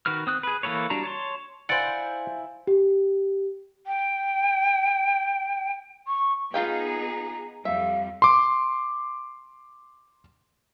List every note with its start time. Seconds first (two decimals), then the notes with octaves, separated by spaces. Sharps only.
0.06 D#3 F#4 B4 F6
0.27 C4 D#6 F#6
0.43 G#4 B4
0.63 E3 A#3 A4 B4 C#5
0.90 G3 D4 F#4 A5 A#5
1.04 C#5 A5 C6
1.69 E4 C5 D5 F5 F#5 G#5
2.67 G4
3.87 G5
6.07 C#6
6.54 B3 D#4 F4 G#4 F5 G5 A#5
7.65 F2 G3 E5 F5
8.22 C6 D6